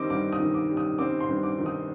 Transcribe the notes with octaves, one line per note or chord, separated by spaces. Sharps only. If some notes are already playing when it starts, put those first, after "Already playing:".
Already playing: D#3 G3 C4 D#5 D6
G2 D6
D#6
D#3
D6
G3
D#6
C4 D6
C6
G2
D6
D#3
D#6